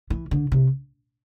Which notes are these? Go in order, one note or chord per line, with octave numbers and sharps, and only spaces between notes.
E3
D3
C3